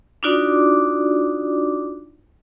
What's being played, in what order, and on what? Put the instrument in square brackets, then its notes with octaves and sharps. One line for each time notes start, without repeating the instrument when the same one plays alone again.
[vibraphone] D4 D#4 F4 F#4 D5 D6